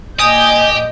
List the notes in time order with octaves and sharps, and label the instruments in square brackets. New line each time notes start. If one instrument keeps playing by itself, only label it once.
[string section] A#2 D#5 G6 [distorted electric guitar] G4 [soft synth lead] G#5 [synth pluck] D#6